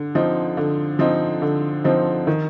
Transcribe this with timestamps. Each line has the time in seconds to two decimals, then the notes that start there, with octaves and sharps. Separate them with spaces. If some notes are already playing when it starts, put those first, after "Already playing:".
Already playing: D3
0.15 F3 C4 D#4
0.57 D3
0.99 F3 C4 D#4
1.42 D3
1.84 F3 C4 D#4
2.27 D#3